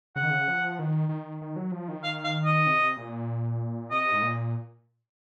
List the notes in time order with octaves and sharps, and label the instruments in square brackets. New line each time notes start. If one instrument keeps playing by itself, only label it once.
[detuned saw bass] C#3 [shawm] F#5
[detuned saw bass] D#3
C#3
F3
D#3
D#3
D#3
F#3
F3
D#3
[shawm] F5
F5
D#5
[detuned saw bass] C3
A#2
[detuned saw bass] C3 [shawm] D#5
[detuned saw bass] G#2
A#2